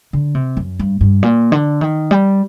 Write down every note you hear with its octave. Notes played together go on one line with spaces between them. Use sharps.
D3
C3
F#2
G2
G2
A#2
D3
D#3
G3